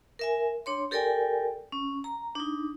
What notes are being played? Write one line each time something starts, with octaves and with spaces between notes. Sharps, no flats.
A#4 E5 G#5
D4 C#5 C6
G4 A4 A#4 D5 G5 G#5
C#4
A#5
D4 D#4